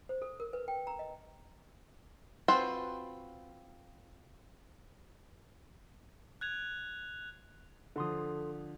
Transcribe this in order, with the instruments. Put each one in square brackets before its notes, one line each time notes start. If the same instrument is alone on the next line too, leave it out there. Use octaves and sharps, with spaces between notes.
[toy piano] C5
A4
A#4
B4
G5
A#5
D#5
[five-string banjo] C4 F4 F#4 B4 C5
[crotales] F#6 G#6 F7
[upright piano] D3 F3 [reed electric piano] A4 C6 D#6